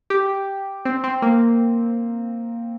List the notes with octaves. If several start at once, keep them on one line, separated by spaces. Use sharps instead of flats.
G4
C4
C4
A#3